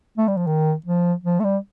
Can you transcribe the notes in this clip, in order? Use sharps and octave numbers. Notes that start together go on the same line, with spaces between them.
A3
G3
F3
D#3
F3
F3
A3
G3